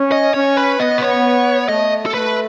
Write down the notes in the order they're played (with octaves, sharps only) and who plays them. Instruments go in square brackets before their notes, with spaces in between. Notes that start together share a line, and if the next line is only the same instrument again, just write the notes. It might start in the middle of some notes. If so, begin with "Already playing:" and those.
Already playing: [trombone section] C#4
[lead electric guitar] D#5
[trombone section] C#4 [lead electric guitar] C#5
[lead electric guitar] B4
[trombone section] B3 [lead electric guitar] D#5
[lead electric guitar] B4
C#5
[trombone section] A3 [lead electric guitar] D#5
[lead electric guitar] A4
[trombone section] A3 [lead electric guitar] B4